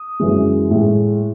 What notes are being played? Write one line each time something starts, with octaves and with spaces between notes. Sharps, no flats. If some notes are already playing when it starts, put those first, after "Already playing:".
Already playing: D#6
F#2 E3 G#3
A2 G#3